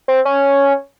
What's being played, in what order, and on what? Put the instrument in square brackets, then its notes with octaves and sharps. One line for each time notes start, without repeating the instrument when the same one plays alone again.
[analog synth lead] C4
C#4